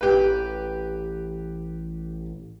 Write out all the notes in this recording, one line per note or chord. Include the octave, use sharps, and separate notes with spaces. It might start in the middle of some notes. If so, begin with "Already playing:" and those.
A1 G4 B4